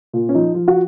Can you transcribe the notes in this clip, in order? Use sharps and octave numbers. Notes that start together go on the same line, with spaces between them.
A#2
C#4
F3 D#4
F3 F4
F#4